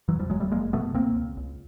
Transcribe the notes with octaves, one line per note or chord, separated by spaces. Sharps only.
E2 E3 F#3
F3 G3
F#1 F#3 G#3
G3 A3
F#1 G#3 A#3
B2 A3 B3
C#2 A#3 C4
C#2
C#2